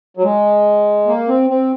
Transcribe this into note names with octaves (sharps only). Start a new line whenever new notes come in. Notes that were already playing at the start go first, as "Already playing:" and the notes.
F#3
G#3
A#3
C4
C4